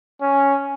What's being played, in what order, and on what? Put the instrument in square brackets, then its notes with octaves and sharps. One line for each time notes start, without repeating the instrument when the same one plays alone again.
[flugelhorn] C#4